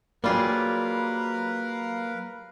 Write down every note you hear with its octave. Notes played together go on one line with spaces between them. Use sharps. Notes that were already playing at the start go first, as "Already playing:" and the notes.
F#3 G3 A#3 F4 G#4 A#4 B4 F5